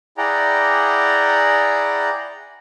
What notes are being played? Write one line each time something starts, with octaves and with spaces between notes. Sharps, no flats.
E4 G#4 D5 F#5 G5 A#5